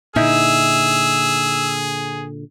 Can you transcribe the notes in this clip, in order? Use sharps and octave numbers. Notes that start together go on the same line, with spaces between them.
A#2 D3 D#4 E4 G#4 E5 E6